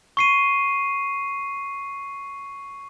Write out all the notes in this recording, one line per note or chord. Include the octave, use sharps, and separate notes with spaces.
C#6 C7 D#7